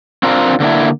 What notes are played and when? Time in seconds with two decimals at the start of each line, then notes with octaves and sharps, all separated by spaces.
0.23 C4 D4 F4 A#4
0.60 D3 A#3 D4 E4